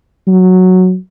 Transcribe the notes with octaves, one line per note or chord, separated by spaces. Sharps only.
F#3